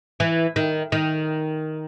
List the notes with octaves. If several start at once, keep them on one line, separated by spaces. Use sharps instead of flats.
E3
D#3
D#3